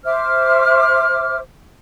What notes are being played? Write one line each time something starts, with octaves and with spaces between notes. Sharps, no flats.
C5 E5 D6 F6